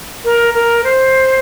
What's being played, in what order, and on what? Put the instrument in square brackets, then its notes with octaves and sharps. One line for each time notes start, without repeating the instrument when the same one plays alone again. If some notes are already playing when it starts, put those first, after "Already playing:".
[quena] A#4
A#4
C5